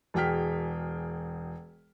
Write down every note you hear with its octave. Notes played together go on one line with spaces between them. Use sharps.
E1 F#4 G#4 G5 F6 B6